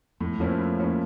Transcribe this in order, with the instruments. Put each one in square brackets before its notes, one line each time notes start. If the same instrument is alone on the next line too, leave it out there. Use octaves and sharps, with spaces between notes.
[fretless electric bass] F2 [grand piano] A2
[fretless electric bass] F2 [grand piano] F3 A#3 C#4 E4
[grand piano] A2
F3 A#3 C#4 E4